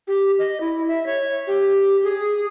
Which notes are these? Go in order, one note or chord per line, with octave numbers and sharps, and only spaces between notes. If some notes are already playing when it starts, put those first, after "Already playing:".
G4
D#5
E4
E5
C#5
G4
G#4